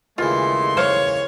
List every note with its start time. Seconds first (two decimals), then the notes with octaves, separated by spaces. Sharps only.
0.18 D#2 C#3 E3 G#3 A3 F4 C6
0.77 C5 C#5 F5